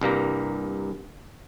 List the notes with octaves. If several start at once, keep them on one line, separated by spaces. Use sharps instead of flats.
C2 G2 A#3 A#5